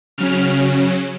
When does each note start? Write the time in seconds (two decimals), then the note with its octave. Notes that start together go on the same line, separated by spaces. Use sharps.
0.18 C#3 F#3 C#4 F6